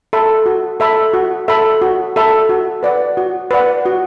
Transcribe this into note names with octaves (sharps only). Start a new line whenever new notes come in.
A4 E5 B5
F#4
A4 E5 B5
F#4
A4 E5 B5
F#4
A4 E5 B5
F#4
B4 D5 F#5
F#4
B4 D5 F#5
F#4